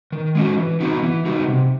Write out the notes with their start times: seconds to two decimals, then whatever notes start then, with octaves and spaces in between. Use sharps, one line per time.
0.12 D#3
0.35 G#3 C#4 F#4
0.58 E3
0.80 G3 B3 D#4 F#4
1.03 E3
1.26 G3 B3 D#4 F#4
1.48 C3